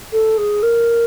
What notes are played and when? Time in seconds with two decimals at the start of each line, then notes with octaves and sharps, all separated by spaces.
0.12 A4
0.37 G#4
0.62 A#4